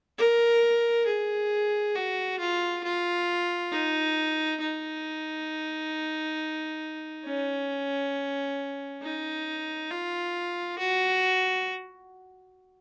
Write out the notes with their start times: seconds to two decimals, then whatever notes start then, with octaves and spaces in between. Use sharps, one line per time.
0.18 A#4
1.06 G#4
1.95 F#4
2.39 F4
2.84 F4
3.72 D#4
4.60 D#4
7.25 C#4
9.02 D#4
9.90 F4
10.78 F#4